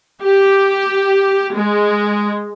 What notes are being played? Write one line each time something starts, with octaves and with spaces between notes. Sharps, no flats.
G4
G#3